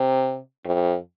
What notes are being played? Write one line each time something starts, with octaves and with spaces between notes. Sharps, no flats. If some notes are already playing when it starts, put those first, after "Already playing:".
Already playing: C3
F2